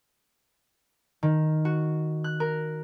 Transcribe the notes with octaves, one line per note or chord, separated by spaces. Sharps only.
D#3
F#4
F#6
A#4